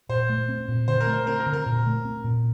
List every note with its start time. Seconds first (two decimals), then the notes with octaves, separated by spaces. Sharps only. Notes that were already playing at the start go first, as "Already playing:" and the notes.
0.09 A#2 C5
0.29 A3
0.49 C4
0.68 A#2
0.88 D3 C5
1.00 A#4
1.07 A3
1.14 C5
1.27 C4 A#4
1.40 A#4
1.46 D3
1.53 A#4
1.66 A#2
1.86 A3
2.05 C4
2.24 A#2